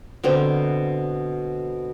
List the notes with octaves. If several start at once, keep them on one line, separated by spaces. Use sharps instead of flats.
B2 D3 C4